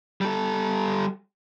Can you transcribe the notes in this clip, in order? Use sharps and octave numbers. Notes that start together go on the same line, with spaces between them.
G3 A4